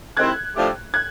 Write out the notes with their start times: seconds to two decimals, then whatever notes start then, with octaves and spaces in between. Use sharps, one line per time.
0.17 C3 D#3 G#3 C4 E4 F#6 G#6
0.55 A2 F3 A3 D4 G4
0.94 F#6 G#6